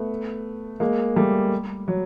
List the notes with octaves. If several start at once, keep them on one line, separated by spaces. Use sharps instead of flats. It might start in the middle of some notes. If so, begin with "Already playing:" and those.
Already playing: A3 B3
G#3 A#3
G3 A3
F#3